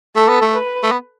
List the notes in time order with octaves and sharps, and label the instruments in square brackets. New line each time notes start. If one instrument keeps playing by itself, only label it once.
[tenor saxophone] A3 [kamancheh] A4
[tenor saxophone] B3
A3
[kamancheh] B4
[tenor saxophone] A3
B3